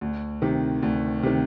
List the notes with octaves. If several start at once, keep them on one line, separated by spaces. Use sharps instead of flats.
D2
C3 D#3
D2
C3 D#3